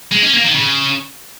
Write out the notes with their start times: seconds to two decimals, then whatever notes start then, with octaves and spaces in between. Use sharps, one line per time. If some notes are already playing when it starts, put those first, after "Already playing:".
0.12 G#3
0.22 C#4
0.33 A#3
0.44 D#3
0.54 C#3